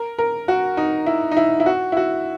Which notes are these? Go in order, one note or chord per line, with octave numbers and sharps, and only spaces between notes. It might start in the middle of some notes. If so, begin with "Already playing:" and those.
Already playing: A#4
A#4
F#4
D#4
E4
D#4
E4
E4
F#4
E4
F#4